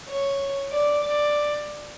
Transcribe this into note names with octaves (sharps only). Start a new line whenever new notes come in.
C#5
D5
D5